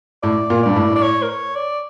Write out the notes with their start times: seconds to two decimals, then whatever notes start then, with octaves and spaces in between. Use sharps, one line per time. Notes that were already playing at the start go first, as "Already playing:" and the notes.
0.23 A2 D5
0.50 A#2
0.63 G2 D5
0.76 A2
0.95 D5
1.02 C#5
1.23 A#4
1.29 C#5
1.56 D5